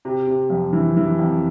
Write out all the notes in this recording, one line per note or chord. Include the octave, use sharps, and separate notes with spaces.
C3
C3
F2
E3
E3
F2